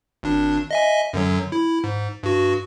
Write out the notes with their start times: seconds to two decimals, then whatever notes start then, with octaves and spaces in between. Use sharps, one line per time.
0.23 G#1 D4
0.71 D#5 E5 G#5
1.13 F#2 D3 F#3
1.52 E4
1.84 G#2
2.23 G2 F#4